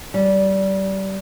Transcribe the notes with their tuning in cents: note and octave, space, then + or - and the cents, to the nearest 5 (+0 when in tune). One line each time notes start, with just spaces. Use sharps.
G3 -25